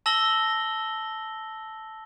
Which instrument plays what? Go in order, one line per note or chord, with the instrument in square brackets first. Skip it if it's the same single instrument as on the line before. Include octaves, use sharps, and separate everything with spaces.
[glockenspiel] A5 E6 A#6 F#7 G7